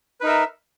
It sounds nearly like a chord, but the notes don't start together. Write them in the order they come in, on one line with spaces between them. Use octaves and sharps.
B4 D#4 A#4 E5